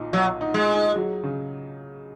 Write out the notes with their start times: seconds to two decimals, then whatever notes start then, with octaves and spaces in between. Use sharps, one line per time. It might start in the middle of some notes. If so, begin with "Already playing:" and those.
Already playing: B1 A#2 D#4
0.13 B1 F#3
0.41 D#4
0.54 G#3
0.69 D#4
0.96 F#3
1.23 C#3